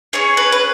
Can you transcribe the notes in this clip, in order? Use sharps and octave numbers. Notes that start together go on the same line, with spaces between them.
C#4 G#4 C#5
B4
B4